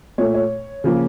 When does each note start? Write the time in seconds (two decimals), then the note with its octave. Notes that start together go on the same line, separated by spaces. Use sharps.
0.18 A#2 A3 C#5
0.34 C#5
0.84 C#3 F3 A#3